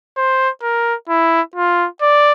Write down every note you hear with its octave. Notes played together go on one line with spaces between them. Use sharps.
C5
A#4
E4
F4
D5